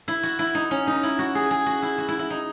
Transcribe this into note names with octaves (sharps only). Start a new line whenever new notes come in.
E4
F#4
E4
D#4
C#4
D#4
E4
F#4
G#4
G#4
F#4
E4
F#4
E4
E4
D#4